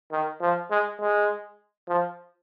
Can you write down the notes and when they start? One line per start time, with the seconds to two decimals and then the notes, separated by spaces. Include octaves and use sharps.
0.12 D#3
0.41 F3
0.71 G#3
1.00 G#3
1.88 F3